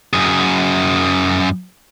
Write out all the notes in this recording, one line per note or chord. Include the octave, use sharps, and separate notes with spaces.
F#2 G#4